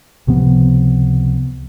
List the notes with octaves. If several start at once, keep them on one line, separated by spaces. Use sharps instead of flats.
C#2 C3 F3 B3